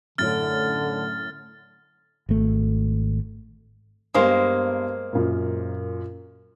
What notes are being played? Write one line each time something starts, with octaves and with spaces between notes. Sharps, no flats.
F#2 A2 D3 C#4 F6 A6
G#1 A3
G2 G3 G#3 A#3 B3 C5
F#2 A#2